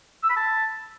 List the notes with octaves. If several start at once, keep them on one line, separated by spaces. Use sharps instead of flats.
E6
B5
A5